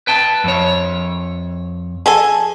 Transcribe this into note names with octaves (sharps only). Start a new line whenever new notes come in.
B4 G5 A5
F2 C#5
G#4 A4 G#5